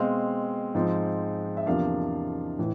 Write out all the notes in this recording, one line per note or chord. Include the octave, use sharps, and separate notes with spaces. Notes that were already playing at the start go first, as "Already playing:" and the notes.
Already playing: B2 G#3 C4 F5
G#2 F3 G#3 C4
E5
E2 C3 F3 A#3 D4 F5
A2 E3